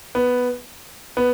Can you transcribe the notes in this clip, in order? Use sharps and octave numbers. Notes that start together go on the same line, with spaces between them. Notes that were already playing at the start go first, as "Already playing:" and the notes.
B3
B3